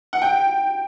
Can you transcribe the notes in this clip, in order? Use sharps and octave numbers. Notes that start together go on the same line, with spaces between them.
F#5
G5